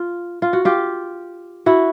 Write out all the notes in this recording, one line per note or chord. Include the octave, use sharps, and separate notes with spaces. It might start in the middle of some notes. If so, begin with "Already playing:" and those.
Already playing: F4
F4
F#4
F4 G4
E4 F#4